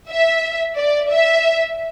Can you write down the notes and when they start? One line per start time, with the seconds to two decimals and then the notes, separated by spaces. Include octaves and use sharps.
0.10 E5
0.77 D5
1.10 E5